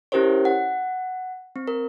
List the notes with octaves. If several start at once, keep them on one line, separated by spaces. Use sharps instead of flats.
C#4 E4 G4 A#4 C5 C#5
F#5
C4
A#4